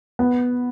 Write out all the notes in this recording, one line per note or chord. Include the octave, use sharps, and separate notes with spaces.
B3